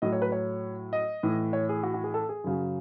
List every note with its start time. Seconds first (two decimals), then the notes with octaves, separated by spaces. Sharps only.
0.02 A2 F#3 D#5
0.12 C#5
0.22 B4
0.32 C#5
0.93 D#5
1.23 A2 E3
1.53 C#5
1.69 G#4
1.83 F#4
1.94 F#4
2.04 G#4
2.14 A4
2.29 G#4
2.44 F#2 C#3 F#3